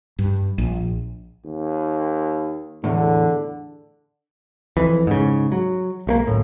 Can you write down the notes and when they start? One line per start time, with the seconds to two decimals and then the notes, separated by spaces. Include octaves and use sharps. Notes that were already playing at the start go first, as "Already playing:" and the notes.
0.19 G2
0.58 A#1
1.45 D#2
2.84 E2 A2 D3
4.77 F2 E3
5.07 G#2 C#3
5.52 F#3
6.07 B1 A3 A#3
6.27 D1 A2